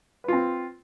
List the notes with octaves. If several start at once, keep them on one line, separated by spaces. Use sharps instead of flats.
C4 F4 B4